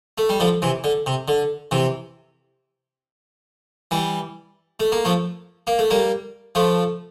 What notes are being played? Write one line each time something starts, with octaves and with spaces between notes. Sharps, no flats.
A3
G3
D3 F3
C3 E3
D3
C3
D3
C3 E3
E3 G3
A3
A#3
F3 A3
A#3
A3
G3 A#3
F3 A3